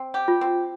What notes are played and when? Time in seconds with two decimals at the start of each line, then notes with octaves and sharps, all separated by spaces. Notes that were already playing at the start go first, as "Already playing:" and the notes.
Already playing: C4
0.14 G4
0.28 F4
0.41 C4